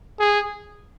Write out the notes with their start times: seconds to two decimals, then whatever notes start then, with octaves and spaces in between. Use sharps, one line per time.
0.20 G#4